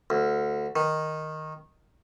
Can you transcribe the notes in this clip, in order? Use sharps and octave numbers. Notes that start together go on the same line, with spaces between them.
D2
D#3